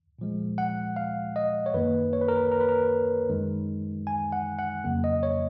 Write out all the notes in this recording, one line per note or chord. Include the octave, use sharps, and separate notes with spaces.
A#2 F3 G#3
F#5
F5
D#5
C#5
F#2 D#3 A#3 B4
C#5
B4
A#4
B4
A#4
B4
A#4
F#2 D#3 G#3
G#5
F#5
F#5
F2 C#3 F#3 A#3
D#5
C#5